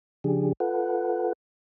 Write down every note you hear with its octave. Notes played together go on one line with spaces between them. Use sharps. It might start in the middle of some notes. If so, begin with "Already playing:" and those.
C#3 F3 D4 G4 G#4
F4 A4 B4 F#5